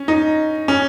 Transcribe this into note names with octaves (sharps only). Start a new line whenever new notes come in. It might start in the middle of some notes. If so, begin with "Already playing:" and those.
Already playing: C#4
D#4
C#4